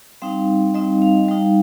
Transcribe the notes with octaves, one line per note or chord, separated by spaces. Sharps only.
G3 C4 D#4 F5
G3 C4 D#4 D#5
F5
G3 D#4